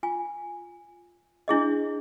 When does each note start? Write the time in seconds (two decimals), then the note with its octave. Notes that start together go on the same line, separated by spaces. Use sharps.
0.03 F4 G#5
1.48 D4 E4 G#4 D#5